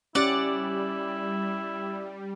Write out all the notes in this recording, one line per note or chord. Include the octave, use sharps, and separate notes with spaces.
G3 C#4 E4 G4 D5 F#5